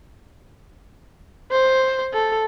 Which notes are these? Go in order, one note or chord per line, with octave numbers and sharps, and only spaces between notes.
C5
A4